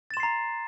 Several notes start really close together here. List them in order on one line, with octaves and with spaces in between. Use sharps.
A6 E7 C6 C7 A#5